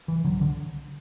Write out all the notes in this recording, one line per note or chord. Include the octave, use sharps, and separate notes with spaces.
E3
C2 D3 F#3
D3